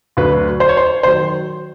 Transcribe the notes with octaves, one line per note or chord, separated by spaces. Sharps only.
D2 D3 F#3 B4
C5
C#5
C5
D#3 F#3 C5